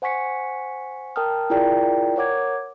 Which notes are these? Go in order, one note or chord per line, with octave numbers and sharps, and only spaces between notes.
C5 F#5 G#5 C#6 B6 C#7
A#4 G5 A5 D#6 F6
E4 F4 G#4 A#4 D5 G5
A#4 C#5 F#5 D6 G#6